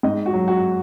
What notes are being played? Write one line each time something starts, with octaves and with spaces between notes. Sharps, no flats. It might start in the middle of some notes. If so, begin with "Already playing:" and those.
G#2 D#5
F#4
F#3
F#4